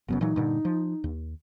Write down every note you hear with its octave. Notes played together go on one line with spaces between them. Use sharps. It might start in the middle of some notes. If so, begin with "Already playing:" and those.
F1 F#2 C#3 B3
A#2 E3 F#3 D#4
G2 A#2 D3
F3
D#2